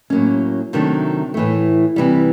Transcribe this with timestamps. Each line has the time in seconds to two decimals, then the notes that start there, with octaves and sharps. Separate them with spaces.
0.10 A2 F#3 A#3 C#4
0.73 C3 D#3 F#3 A3 D4
1.34 A2 E3 A3
1.96 C3 E3 G3